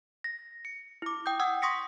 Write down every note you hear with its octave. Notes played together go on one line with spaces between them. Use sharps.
A#6
C#7
E4 D6
G5 D#6 G6
F#5 D#6 E6 G#6
C6 C#6 D#6 A#6 B6 C#7